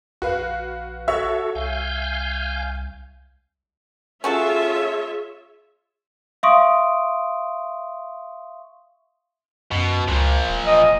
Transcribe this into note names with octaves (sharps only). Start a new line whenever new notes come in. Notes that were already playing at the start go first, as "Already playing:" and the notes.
A#1 F#4 B4 F5
F#4 A4 C#5 E5
C2 F5 G#5 G6
C#4 F4 F#4 G#4 A4 C#5 E5
E5 F5 C6 C#6 D#6 D7
F#2 B2
C#2 A#2 F3
D1
D#5